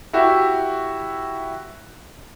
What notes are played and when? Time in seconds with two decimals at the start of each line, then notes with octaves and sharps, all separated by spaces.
0.13 E4 F#4 G4 E5